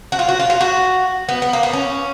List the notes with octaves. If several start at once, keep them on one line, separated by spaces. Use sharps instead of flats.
F#4
F4
F#4
F4
F4
F#4
B3
B3
A#3
B3
C#4